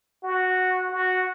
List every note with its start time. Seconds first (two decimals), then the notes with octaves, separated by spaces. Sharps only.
0.24 F#4
0.91 F#4